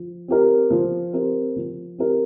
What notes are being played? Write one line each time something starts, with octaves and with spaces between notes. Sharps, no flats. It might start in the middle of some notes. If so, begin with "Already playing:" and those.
Already playing: F3
C4 G4 A#4
F3
C4 G4 A#4
F3
C4 G4 A#4